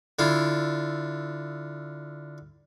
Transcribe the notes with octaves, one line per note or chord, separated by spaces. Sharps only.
D3 E4 F4